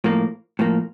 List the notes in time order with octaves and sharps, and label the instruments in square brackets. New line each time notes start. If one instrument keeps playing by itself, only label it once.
[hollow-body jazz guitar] A2 F3 A#3
A2 F3 A#3